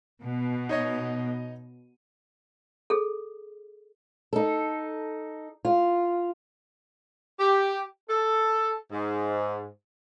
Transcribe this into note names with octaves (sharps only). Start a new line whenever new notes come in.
B2
D#4 C#5 D#5
G#4 A4
D#4 A4
F4
G4
A4
G#2